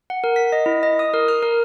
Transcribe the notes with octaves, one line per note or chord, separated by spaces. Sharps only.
F#5
A#4
B6
D#5
E4
D#5
D#6
A#4
F6
A#4